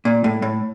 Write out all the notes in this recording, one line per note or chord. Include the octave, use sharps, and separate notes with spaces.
A#2
A2
A2